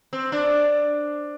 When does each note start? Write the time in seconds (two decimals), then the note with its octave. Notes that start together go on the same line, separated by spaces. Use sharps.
0.13 C4
0.32 D4